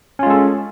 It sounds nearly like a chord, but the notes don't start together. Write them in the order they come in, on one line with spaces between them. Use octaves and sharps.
C#4 F4 G#3 A4